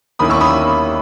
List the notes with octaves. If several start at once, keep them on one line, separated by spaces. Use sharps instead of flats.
D#2 D#3 A#3 C#4 E4 B5 D#6
C#6 E6
B5 D#6